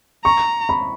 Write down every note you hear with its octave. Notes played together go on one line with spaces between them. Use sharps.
A#5 C#6
B5